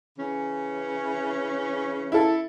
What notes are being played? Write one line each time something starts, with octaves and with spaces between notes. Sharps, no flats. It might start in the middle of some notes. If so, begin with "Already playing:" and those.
C#3 E3 C#4
E4 A4